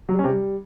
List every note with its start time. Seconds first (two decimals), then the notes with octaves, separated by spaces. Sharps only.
0.09 F#3
0.14 G3
0.19 C#4
0.24 C3
0.29 G3